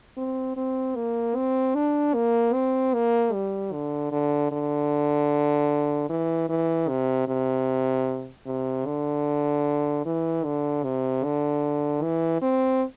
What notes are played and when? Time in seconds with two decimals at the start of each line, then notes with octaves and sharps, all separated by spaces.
0.17 C4
0.56 C4
0.95 A#3
1.36 C4
1.75 D4
2.14 A#3
2.54 C4
2.94 A#3
3.33 G3
3.72 D3
4.12 D3
4.52 D3
6.09 E3
6.49 E3
6.89 C3
7.28 C3
8.47 C3
8.86 D3
10.05 E3
10.44 D3
10.84 C3
11.24 D3
12.02 E3
12.42 C4